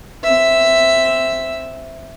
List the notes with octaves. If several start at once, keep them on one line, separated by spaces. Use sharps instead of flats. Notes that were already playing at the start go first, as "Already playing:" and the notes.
C4 E5